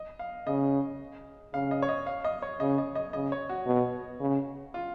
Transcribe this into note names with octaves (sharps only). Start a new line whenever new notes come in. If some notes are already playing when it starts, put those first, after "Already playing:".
Already playing: D#5
F5
C#3 D#5
C#3 F5
D#5
C#5
D#5
F5
D#5
C#5
C#3 D#5
D#5
D#5
C#3 D#5
C#5
F#4
B2
C#3
F4